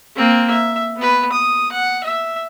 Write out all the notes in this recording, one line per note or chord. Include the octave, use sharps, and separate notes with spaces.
A#3 C4
E5
B3 B4
D#6
F#5
E5